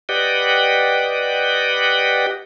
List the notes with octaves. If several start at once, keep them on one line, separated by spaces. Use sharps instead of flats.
G4 B4 D5 D#5 F#5 G5